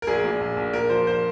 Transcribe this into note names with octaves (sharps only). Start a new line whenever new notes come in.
A#4
A#1 G#4
A#2
A#1
A#1
A#2 A#4
F3 C5
C5